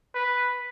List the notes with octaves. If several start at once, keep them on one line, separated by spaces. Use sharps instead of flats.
B4